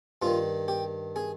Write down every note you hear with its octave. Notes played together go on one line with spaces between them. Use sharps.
G2 D#3 F4
G4
G#4